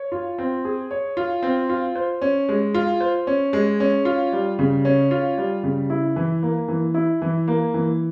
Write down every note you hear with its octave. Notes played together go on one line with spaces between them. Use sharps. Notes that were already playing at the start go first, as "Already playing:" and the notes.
Already playing: C#5
F4
C4
G#4
C#5
F4
C4
F4
C5
C#4
G#3
F4
C5
C#4
G#3
C#4
F4
G3
C#3
C#4
F4
G3
C#3
E4
E3
A#3
E3
E4
E3
A#3
E3